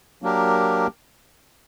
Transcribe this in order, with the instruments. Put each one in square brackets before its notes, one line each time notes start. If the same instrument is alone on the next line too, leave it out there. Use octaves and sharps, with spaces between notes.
[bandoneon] F#3 A#3 D4 G4 A#4